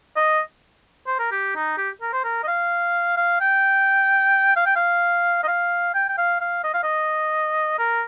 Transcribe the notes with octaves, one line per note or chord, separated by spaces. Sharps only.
D#5
C5
A#4
G4
D#4
G4
A#4
C5
A#4
D#5
F5
F5
G5
F5
G5
F5
D#5
F5
G5
G5
F5
F5
D#5
F5
D#5
A#4